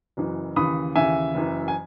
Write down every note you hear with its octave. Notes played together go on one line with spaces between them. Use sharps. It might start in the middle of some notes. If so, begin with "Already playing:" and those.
F#1 F#2 E3
D#2 C#3 E3 B5 D#6
D#2 C#3 E3 E5 G#5
F#1 F#2 E3
G#5